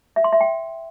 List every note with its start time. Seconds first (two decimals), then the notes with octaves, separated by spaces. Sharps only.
0.16 E5
0.24 C6
0.32 E5
0.41 G5